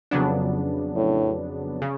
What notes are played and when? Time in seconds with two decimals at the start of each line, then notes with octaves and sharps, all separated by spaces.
0.11 F2 C#3 F#3 B3 D4
0.96 A2
1.82 C#3